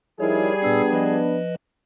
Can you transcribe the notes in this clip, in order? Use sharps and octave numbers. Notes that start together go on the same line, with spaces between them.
F3 G3 D#4 E4 G#4 A#4 C#5
A#2 B3 D4 E6 C7
F3 B4 D#5